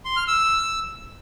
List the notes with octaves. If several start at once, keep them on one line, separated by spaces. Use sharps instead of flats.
C6
F6
E6